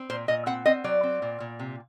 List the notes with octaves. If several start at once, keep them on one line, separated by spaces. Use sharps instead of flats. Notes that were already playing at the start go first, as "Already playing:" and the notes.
Already playing: C4
A#2 C5
A#2 D#5
C4 F#5
C4 D#5
F#3 D5
C4
A#2
A#2
C3